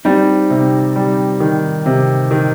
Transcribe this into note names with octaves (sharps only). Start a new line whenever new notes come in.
G3 C4 D#4
C3
G3
D#3
C3
D#3